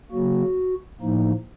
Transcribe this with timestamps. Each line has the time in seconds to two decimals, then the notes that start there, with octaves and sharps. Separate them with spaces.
0.12 C#3 F#3 A#3 F#4
1.01 A2 F3 A#3 D#4